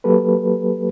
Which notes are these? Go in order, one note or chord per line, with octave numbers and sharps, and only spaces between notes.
F#3 A#3 G4 A4 B4